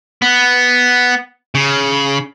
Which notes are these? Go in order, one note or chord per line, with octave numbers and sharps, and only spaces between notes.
B3
C#3